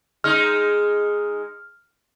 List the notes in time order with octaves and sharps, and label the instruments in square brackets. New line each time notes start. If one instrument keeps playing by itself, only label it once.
[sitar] G#3 D#4 [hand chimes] F6